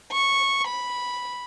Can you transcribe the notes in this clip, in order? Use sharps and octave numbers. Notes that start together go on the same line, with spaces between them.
C#6
B5